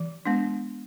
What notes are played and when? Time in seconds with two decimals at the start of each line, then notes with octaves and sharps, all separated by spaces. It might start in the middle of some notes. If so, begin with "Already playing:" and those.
Already playing: E3
0.25 G#3 B3 D4